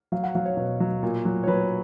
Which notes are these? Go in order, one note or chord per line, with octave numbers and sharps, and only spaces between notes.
F#3 F5
F#5
F#3 F5
C#5
B2
F#3
A#2
F#3
C#5
F#3 B4